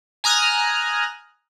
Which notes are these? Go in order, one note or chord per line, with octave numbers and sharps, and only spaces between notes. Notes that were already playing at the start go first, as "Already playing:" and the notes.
G#5 A#5 D#6 F6 F#6